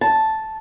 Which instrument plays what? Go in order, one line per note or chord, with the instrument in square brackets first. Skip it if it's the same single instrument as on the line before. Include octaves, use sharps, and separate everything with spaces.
[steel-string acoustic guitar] A5